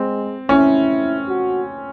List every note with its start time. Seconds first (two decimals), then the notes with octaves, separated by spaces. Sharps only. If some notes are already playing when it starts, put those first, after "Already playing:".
Already playing: G#3 C4
0.49 C#4 E4
1.28 F#4